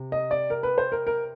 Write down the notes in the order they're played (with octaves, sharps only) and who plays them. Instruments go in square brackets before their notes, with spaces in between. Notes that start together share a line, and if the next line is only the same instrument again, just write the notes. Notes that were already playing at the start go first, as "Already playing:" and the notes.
Already playing: [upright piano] C3
D#5
D5
A#4
B4
C5
A#4
A#4